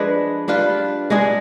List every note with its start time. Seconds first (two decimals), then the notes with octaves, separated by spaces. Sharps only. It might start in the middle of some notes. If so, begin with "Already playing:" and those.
Already playing: F3 G#3 D4 G#4 B4
0.48 G3 D4 F4 B4
1.10 G#3 D4 G#4